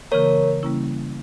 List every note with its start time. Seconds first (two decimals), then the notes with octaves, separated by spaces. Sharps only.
0.11 C#3 E3 A#3 A#4 C#5
0.63 C#3 G3 A#3 C#4 E4